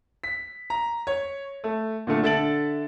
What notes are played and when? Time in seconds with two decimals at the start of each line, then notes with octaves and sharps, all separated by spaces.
0.24 B6
0.70 A#5
1.07 C#5
1.64 A3
2.07 A#2 D3 A3
2.23 D3 A4 E5 A6 D7 F#7